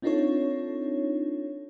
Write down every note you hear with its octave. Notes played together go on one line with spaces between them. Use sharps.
C4 D4 D#4 F4 A4 C#5